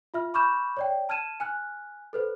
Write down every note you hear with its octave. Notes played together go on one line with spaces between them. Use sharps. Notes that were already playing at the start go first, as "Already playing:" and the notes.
F4 E5 F6
B5 C#6 D6 F6 G6 E7
C#5 D5 G5
A5 F6 G#6 D#7 E7
G#5 F6 F#6
A4 B4 C5